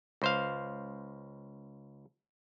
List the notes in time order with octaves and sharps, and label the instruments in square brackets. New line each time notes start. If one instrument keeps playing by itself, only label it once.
[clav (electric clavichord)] C#2 C5 F5